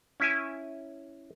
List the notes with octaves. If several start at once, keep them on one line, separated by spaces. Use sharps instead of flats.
C#4 E4 G#5